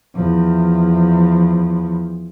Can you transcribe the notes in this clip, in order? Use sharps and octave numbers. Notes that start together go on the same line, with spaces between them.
E2 F3